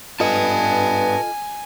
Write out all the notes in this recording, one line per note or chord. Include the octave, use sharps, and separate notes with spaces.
G2 B3 F4 A4 B4 D#5 G#5 A5